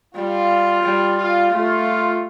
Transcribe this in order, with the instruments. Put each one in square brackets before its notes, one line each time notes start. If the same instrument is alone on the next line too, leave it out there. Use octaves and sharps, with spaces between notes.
[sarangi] G3 [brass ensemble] F4
[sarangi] G3
[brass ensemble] F4
[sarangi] A3 [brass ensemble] F4